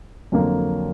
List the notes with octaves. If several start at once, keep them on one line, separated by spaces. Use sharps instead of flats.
F2 D3 F#3 A#3